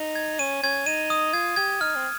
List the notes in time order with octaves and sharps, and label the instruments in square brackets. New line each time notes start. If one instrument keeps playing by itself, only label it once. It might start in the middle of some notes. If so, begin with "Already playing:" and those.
Already playing: [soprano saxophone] D#4
[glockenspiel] G#6
[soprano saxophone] C#4 [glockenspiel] D#7
[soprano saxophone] C#4 [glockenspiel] G#6
[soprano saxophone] D#4 [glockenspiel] D#7
[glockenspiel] D#6
[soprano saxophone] F4 [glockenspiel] G#6
[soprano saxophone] G4 [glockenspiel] G#6
[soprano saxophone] D#4 [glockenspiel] F6
[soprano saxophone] C4